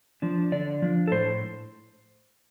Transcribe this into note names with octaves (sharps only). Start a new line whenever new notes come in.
F3 D4
D3 D5
F3 D4
A4
A2 C5